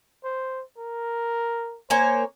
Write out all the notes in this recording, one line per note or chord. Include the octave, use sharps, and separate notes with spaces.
C5
A#4
A#3 C5 C#5 G#5